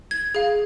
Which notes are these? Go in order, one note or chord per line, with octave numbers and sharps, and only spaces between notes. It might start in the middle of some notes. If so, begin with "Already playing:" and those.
G#6
G#4 F5